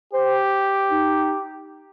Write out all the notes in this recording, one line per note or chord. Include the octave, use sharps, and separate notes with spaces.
G4 C5
D#4